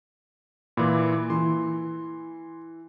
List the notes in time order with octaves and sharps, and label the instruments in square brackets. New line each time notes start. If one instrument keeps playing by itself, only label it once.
[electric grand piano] A#2 E3 [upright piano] B5 C6 D6
[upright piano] E3 [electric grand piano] C6